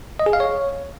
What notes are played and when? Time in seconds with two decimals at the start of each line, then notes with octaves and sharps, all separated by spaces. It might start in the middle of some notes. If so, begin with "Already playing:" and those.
0.20 D#5
0.26 G#4
0.33 F5
0.40 C#5